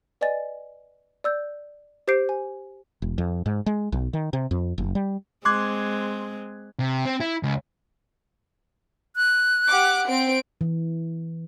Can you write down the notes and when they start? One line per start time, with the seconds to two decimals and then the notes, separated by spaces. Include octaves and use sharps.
0.21 B4 D5 D#5 G#5 A6
1.24 D5 E6 G6
2.08 G4 C5 D6 G6 C7 D7
2.29 G#5
3.02 E1
3.18 F2
3.46 G#2
3.66 G#3
3.92 B1
4.13 D#3
4.33 C3
4.51 F2
4.78 F#1
4.95 G3
5.45 G#3 C4 C6 D6 F#6 G#6
6.80 C3
7.06 C4
7.20 E4
7.43 C#2
9.16 F#6
9.67 G4 F#5 D6
10.09 C4 D7
10.61 E3